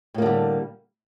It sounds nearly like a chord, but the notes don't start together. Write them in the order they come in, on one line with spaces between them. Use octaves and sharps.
A2 A#3 D3 G3